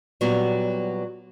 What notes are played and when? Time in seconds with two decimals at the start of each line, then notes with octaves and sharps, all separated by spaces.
0.21 A#2 F#3 G3 B3 F#4